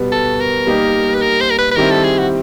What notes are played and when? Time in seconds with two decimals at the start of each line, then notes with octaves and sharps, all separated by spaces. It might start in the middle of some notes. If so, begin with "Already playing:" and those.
Already playing: B2 G3 B3
0.12 A4
0.41 A#4
0.67 G3 A#3 D#4 G4
1.15 B4
1.22 A#4
1.41 C5
1.50 A#4
1.58 B4
1.71 B4
1.77 D#3 G3 C4 E4 G4 A#4
1.91 A4
2.04 G#4
2.19 F#4